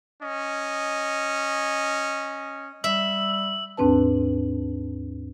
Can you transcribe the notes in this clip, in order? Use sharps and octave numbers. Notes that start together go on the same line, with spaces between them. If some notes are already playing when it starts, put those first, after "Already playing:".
C#4 D#5
G3 E5 E6 F#7
D#2 G#2 C4 D4 B4 A5